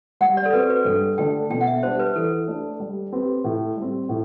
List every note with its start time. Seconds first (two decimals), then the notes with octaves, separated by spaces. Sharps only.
0.21 G3 F#5
0.37 D5
0.45 A4
0.53 C4 F#4 B4 C5
0.70 B4
0.85 G2 A4
1.18 D3 A3 D4 G5
1.50 B2 G5
1.61 F#5
1.67 E5
1.82 G3 D4 G4 C5 D5
1.99 B4
2.15 E3 A4
2.48 A3 D4
2.80 G3
3.12 C4 G4 B4
3.44 A2
3.77 G3 C4
4.09 A2